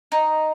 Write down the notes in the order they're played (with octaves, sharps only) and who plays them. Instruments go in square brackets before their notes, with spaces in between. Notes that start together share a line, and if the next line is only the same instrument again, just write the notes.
[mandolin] D#4